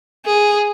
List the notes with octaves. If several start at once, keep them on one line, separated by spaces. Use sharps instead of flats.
G#4